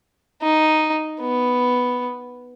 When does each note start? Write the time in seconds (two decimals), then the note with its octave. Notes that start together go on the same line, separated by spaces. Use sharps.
0.42 D#4
1.20 B3